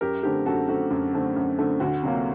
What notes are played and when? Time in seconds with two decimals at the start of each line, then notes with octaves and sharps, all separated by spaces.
0.01 F#2 G4 A#4
0.23 D3 A3 C4 G4
0.46 F#2 F#4 A4
0.68 D3 A3 C4 F#4
0.90 F#2
1.13 D3 A3 C4
1.36 F#2
1.59 D3 A3 C4
1.80 D2 F#4
2.03 C3 F#3 A#3